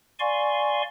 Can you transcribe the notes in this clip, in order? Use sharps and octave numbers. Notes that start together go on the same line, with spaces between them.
D5 F5 G#5 C6 C#6